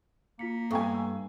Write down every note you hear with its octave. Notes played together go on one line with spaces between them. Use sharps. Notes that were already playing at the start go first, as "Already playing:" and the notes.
A#3 F4 B6 C#7
G2 A3 B3 G5 G#5 C#6 D#6
E6